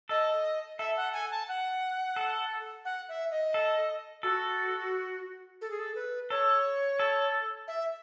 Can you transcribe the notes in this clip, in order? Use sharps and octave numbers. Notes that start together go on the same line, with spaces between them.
A4 D#5
A4 E5
F#5
G#5
A5
F#5
A4
F#5
E5
D#5
A4
F#4 A4
A4
G#4
A4
B4
A4 C#5
A4
E5